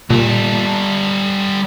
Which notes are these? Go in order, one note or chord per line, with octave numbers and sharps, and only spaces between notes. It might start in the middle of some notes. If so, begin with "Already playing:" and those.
A#2 G3 A4